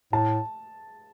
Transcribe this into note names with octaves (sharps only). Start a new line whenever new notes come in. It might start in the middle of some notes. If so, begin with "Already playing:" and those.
A2 A5